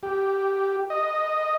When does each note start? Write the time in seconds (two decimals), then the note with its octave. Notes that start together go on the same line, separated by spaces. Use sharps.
0.03 G4
0.90 D#5